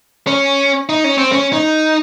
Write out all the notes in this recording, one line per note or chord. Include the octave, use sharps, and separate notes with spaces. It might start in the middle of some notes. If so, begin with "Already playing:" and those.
C#4
D#4
C#4
C4
C#4
D#4